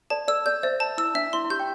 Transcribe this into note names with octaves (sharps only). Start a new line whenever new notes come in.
A4 D5 A5
A4 D5 E6
A4 D5 G6
C5 D5 E5
A5
E4 E6
D4 E5
E4 C6
E4
G4 G6
G5